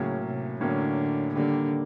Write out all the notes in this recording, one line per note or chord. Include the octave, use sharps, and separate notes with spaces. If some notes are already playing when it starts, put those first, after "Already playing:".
Already playing: A2 C#3 F#3 A#3 C#4
C3
A2 D3 F#3 A#3 C#4
D3 D#3 G3 A#3